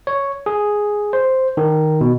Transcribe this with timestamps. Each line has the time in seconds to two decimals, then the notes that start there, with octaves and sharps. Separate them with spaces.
0.07 C#5
0.46 G#4
1.13 C5
1.57 D#3
2.01 B2